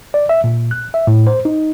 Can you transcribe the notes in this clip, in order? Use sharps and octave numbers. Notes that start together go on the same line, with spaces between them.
D5
E5
A#2
F#6
E5
A2
C5
D#4